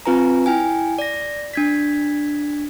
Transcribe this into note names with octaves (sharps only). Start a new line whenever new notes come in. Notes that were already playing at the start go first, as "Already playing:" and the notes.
C4 F4 B4 G#5 A#5
E4 G5 G#5
D5 A#6
D4 G#6 B6